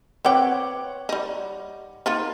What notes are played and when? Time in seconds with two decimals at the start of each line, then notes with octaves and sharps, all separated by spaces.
0.25 C4 B4 C#5 F#5 G5 D6
1.09 G3 D#4
2.06 A#3 D#4 F4